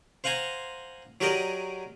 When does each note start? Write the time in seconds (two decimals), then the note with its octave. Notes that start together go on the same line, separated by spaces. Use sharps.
0.24 C5 F5 F#5 G#5 A#5 C6
1.21 F#3 G4 G#4 A#4 D5 D#5